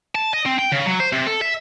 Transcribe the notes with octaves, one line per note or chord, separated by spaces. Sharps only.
A5
D#5
C4
G5
C#3
F#3
C5
C3
A4
E5